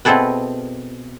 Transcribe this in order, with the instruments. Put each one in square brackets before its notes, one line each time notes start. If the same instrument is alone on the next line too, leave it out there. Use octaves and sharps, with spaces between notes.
[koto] B2 C4 E4 G#4 A4 B4